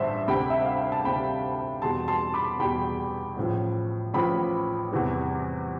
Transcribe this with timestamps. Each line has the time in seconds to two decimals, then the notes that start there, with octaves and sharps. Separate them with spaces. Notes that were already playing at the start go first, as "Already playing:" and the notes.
Already playing: A1 G2 D3 G3 C5 E5
0.27 D2 C3 G3 G5 B5
0.50 E5
0.65 F5
0.78 G5
0.92 A5
1.05 D2 C3 G3 G5 B5
1.82 E2 B2 G3 A5 C6
2.08 A5 C6
2.34 B5 D6
2.59 E2 B2 G3 G5 B5
3.36 A1 A2 F3
4.14 A1 A2 F3 G5 B5
4.91 E2 C3 E3 G3